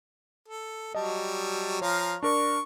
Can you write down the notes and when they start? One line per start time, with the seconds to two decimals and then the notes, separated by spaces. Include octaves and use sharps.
0.48 A4
0.95 F#3 G3 D#5 A5
1.81 F3 C#5 F5 A#5
2.23 D4 A#4 D5 C#6